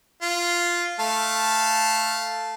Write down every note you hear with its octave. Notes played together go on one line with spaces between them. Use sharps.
F4
A3 F5 A5